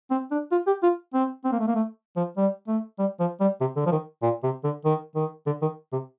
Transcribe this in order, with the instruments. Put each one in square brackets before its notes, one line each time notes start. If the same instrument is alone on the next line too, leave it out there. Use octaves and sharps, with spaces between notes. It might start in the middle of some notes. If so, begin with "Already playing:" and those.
[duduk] C4
D4
F4
G4
F4
C4
C4
A#3
A3
A#3
A3
F3
G3
A3
G3
F3
G3
C3
D3
F3
D#3
A#2
C3
D3
D#3
D#3
D3
D#3
C3